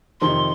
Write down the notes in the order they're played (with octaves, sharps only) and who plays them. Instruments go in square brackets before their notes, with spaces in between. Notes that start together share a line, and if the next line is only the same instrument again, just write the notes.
[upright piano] F2 C3 D#3 [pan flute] C6